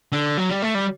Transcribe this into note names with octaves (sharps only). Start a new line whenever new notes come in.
D3
F#3
G3
A3
G3